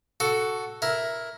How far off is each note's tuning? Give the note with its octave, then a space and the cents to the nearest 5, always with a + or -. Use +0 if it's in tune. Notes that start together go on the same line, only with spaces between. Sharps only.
F#4 +5 A4 +0
E4 +0 A#4 +10